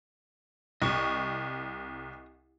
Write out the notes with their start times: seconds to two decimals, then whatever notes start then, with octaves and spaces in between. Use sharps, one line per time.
0.82 C2 D#5 C#6